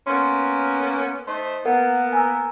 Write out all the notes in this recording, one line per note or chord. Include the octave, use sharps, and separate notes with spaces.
A#3 B3 C#4 C6
A3 D#4 C5
A#3 B3 A#4 F#5
G#5 A#5 E6